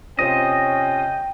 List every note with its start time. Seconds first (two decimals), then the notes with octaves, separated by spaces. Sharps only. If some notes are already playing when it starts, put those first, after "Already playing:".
0.19 C3 C#4 F4 C5 D#5 G5